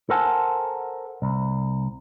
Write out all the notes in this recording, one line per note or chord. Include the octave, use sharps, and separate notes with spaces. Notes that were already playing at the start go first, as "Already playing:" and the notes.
A4 A#4 C5 F#5 G#5 A5
C2